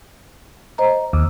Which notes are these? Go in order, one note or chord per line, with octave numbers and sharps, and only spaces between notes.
C5 D#5 A#5
D#2